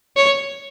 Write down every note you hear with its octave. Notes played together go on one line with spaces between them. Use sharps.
C#5